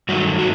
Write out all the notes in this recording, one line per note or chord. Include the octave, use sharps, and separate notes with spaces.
G2 D#3 F#3 A3 F#4
F#4